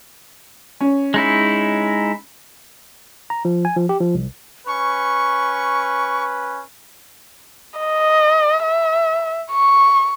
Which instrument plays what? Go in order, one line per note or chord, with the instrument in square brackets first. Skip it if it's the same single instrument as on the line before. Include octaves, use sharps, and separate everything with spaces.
[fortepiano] C#4
[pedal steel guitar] G#3 D#4 E4
[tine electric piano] A#5
F3
G#5
F3
G4
F3
C2
[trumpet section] C#4 B4 [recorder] C#6
[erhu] D#5
E5
C#6